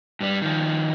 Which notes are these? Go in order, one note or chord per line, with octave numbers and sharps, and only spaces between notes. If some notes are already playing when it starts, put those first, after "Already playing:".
G2 G3
D#3 F3